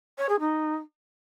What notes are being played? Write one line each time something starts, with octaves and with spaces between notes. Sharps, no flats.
C#5
G#4
D#4